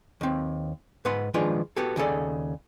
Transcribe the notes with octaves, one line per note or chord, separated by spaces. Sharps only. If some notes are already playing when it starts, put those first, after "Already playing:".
D#2 C4
G#2 B4 F#5 C6
D#3 F3 G#3 D4 F4 B4
B3 F#4 G4 A4
D#2 C#3 G#4 A4 D5